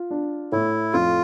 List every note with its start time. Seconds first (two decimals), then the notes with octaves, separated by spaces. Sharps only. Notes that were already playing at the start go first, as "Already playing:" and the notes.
Already playing: F4
0.10 D4
0.52 A2 E4
0.93 F2 F4